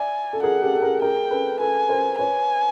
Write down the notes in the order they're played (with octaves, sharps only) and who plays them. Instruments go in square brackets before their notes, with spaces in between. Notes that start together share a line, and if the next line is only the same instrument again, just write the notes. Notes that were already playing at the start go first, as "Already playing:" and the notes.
Already playing: [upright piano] D5 E5 [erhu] G#5
[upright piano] A4
[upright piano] G#4 A#4 [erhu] F#5
[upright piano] G4 A4
A4
G#4 A#4
[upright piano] G#4 A#4 [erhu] G5
[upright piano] A4 B4
[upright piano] A4 B4 [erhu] G#5
[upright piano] A#4 C5
[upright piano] B4 C#5 [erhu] G#5